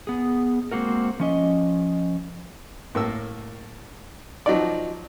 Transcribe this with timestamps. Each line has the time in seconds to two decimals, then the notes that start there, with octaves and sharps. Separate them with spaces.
0.07 B3 G#4
0.72 G#3 A#3 C4 F#4 A#4
1.20 F3 C#4 D#5
2.95 A2 A#3 E6
4.46 F3 F#3 D#4 D5